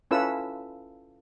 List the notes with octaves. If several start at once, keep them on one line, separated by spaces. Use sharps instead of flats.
C#4 E4 F4 A4 B4 E6